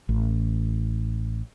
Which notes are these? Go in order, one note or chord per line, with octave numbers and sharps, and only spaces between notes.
A1